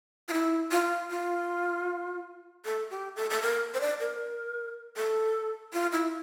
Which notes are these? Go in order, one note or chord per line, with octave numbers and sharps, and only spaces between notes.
F4
E4
F4
F4
A4
G4
A4
A4
A#4
C5
D5
A#4
A4
F4
E4